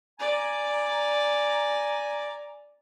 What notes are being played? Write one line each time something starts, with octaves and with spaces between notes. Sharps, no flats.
D5 G#5 A#5